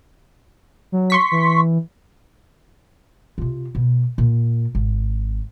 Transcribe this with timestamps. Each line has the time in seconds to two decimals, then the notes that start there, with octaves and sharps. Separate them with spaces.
0.92 F#3
1.10 C6 C#6 B6
1.31 E3
3.38 C3 F4
3.75 B2
4.18 A#2
4.75 G#1